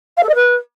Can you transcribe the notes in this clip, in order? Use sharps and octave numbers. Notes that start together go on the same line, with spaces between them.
F5
A4
D#5
B4